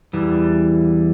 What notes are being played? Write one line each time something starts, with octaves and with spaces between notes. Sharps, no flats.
E2 E3 G3